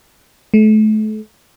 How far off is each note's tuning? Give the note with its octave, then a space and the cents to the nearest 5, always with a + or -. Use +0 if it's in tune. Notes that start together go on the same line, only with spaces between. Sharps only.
A3 -35